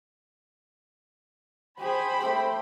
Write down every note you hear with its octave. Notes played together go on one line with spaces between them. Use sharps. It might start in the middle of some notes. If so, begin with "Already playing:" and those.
G4 G#4 C5 B5
A3 C4 G4 G5